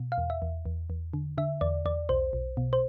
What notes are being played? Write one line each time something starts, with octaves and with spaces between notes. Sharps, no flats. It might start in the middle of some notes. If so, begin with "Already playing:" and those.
Already playing: B2
F5
E2
E5
E2
E2
E2
D3
D3 E5
E2 D5
E2 D5
B1 C5
B1
B2
C5